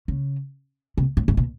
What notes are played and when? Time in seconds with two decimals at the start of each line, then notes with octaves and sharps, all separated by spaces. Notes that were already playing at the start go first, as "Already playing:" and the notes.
0.08 C#3
0.97 C3
1.17 A2
1.28 G#2
1.37 B2